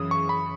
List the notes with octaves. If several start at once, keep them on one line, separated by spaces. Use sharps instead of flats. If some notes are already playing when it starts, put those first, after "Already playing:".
Already playing: F#2 C#3 E3 D#6
C#6
B5